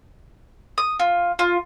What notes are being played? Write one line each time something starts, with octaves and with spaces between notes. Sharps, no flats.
D#6
F4
F4